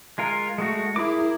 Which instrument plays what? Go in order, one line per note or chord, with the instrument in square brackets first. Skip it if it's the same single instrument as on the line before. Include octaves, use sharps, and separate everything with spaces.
[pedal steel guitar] G#3 F4 A#4
G#3 A3 F#4
[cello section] E4 A#4 [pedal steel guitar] G#4 D6